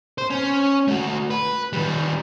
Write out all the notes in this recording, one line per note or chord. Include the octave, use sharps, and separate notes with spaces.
C5
C#4
A3 F#4
B4
D#3 G3